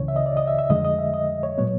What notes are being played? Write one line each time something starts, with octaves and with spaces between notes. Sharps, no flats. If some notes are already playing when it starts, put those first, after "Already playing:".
Already playing: C#2 C#3 E3 C#5
E5
D#5
D5
D#5
E5
E5
F2 D3 F3 G#3 D#5
D#5
E5
D#5
C#5
A#2 F#3 B3 C#5